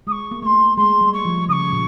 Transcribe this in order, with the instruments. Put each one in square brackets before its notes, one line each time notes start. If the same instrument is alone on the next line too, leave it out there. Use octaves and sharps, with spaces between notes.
[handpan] G#3 [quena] D#6
[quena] C#6
[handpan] A#3
[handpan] A3 [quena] C6 C#6
[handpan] G#3 [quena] C6
[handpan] G3
[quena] C#6
[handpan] F3
[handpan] C#3 [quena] C#6 D#6
[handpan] A#2